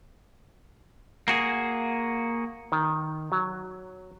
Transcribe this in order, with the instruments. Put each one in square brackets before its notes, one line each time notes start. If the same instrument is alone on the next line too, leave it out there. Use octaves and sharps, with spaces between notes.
[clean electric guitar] A#3 F#4 G#4
[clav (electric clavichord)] D#3
F#3